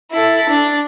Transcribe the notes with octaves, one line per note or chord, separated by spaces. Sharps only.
E4 A4
D4